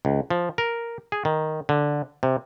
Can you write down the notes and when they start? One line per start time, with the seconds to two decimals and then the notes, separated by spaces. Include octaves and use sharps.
0.05 C#2
0.30 F3
0.58 A#4
1.12 G#4
1.25 D#3
1.69 D3
2.23 C3